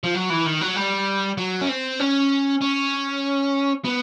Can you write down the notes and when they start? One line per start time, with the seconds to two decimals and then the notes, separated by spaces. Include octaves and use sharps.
0.04 F3
0.14 F#3
0.30 E3
0.46 D#3
0.61 F#3
0.76 G3
1.38 F#3
1.62 C#4
1.69 C4
2.00 C#4
2.61 C#4
3.85 B3